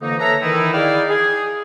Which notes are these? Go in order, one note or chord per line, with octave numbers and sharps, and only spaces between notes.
F2 D3 E3 A#3 D#4
A4 B4 C#5 E5 A#5
D#3 E3 D#4 E4
D#4 E4 G#4 D5 F5 G5
G#4